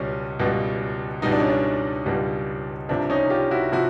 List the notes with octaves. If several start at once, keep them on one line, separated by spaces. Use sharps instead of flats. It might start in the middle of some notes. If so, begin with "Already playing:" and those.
Already playing: C#2 B2 G3 C#4
C#2 B2 G3
C#2 B2 G3 D#4
D4
C#4
D4
C#2 B2 G3
C2 C3 F3 D4
C#4 D#4
F4 G4
E4 F#4
C3 F3 E4 F#4